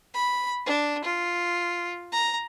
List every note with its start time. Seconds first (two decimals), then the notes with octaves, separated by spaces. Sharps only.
0.14 B5
0.66 D4
1.04 F4
2.12 A#5